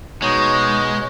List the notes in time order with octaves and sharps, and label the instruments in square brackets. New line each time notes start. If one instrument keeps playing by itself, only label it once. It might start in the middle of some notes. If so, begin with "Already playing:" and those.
[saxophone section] B2 [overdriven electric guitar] G#3 [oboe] D#4 [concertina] C#5